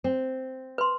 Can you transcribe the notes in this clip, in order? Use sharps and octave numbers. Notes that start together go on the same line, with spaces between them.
C4
B4 C6